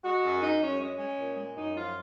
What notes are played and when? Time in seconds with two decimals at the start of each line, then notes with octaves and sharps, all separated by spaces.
0.03 G#3 F#4
0.22 F#2
0.42 G#3 D#4
0.61 F#2 C#4
0.80 G#3 C#4
0.99 G#3
1.18 A#2
1.37 G#3
1.56 F#2 D#4
1.76 F3 F4